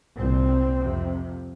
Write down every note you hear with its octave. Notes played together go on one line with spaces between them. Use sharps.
C2 A#2 C4
F2 C3